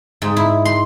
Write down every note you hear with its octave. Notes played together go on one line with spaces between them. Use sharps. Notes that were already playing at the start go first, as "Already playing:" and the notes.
G#2
E4
C6